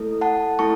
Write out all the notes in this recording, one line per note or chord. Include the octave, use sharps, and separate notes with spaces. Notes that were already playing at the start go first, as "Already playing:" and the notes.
Already playing: A3 E4 A4
F#5 A5
A3 E4 A4 A5 C#6